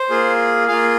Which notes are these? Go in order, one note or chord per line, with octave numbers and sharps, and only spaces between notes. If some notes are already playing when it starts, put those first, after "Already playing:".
Already playing: C5
A#3 F4 G#4
A#3 F4 G#4 F5